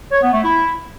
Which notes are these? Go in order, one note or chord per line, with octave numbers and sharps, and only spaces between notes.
C#5
B3
A3
E4